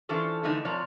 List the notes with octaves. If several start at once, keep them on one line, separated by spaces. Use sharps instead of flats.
E3 C#4 D4 F4 A4 C5
D3 E3 F3 A3 D#4
C3 F3 C#5 D5 A#5